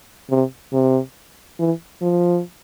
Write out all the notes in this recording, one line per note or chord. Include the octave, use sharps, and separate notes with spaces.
C3
C3
E3
F3